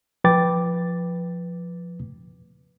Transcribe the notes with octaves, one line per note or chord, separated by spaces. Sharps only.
F3 B4 G5 D6 A6